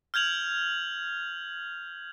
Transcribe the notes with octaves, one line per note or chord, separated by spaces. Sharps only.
F6 G6 G#6 F7 F#7